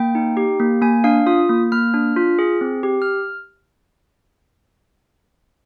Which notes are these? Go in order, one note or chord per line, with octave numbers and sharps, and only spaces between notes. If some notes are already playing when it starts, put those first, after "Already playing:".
Already playing: A#3 G5
D#4
G4
A#3
A#3 G#5
D4 F5
F4 D#6
A#3
A#3 F6
D4
F4
G#4
C4
G4
F6